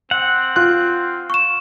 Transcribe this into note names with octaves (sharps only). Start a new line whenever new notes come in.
C4 F#5
F4 F#6
C#6 E7